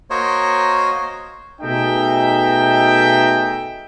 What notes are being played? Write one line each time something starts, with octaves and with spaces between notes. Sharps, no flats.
A#3 F#4 A#4 C5 C#5 D#5
B2 A3 D#4 G#4 E5 G5